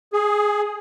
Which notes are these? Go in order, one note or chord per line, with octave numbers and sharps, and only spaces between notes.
G#4